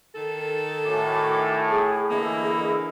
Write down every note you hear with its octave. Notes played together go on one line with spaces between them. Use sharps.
D#3 A4
A2 F#4 G#5 D6
G#4
D3 E3 A#3 E4 G#4 D#5